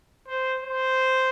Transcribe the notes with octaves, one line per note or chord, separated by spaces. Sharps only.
C5
C5